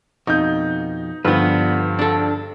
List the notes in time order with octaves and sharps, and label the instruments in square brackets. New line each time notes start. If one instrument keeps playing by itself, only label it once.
[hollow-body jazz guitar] F2 B2 [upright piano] D#4 G6
[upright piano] G2 D3 F3 [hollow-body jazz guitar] B3 B4
[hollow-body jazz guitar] D4 A4